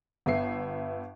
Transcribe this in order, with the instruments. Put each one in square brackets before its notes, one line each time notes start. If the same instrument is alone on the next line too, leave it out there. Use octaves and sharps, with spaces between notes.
[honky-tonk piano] G1 B3 E5 C7